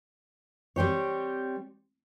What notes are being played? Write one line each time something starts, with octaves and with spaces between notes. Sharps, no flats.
G3 C4 G4 C#5